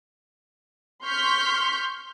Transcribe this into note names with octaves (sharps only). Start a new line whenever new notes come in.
C6 C#6 F6 G6 B6